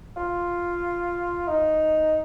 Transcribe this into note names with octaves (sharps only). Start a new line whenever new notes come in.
F4
D#4